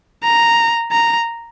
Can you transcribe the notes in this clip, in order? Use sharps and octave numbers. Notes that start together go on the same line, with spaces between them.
A#5
A#5